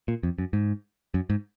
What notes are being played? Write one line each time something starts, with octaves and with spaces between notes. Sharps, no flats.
A#2
F2
F#2
G#2
F#2
G#2